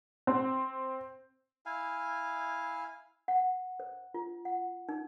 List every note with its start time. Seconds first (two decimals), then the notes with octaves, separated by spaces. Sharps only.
0.27 C4
1.66 E4 F5 G#5
3.28 F#5
3.80 C5
4.14 F4
4.45 F#5
4.89 D#4